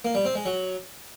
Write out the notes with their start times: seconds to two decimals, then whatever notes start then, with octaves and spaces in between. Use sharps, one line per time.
0.05 A#3
0.15 G3
0.25 C4
0.35 G#3
0.46 F#3